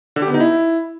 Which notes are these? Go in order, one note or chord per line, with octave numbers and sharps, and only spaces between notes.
D3
G4
B3
D#4
E4